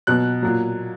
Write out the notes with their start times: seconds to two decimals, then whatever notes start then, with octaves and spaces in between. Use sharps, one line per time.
0.07 B2 F#3 F#6
0.42 A#2 F#3